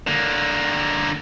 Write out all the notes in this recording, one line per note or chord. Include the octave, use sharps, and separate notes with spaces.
D3 A#3